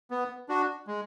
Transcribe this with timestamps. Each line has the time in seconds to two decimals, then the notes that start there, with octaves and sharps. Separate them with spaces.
0.11 B3
0.49 D4 F#4
0.87 G#3